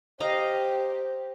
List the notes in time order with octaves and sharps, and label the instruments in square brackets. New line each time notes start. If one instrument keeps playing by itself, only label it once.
[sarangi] G4 [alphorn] C5 [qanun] D#5 F5 A#5